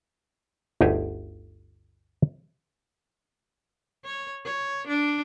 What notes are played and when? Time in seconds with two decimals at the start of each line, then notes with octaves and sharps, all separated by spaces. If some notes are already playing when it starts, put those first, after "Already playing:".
0.81 G1 D2 D#4 G4 G#4 E5
4.05 C#5
4.45 C#5
4.88 D4